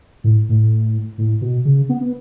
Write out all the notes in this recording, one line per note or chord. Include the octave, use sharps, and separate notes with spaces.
A2
A2
A2
B2
C#3
B3
B3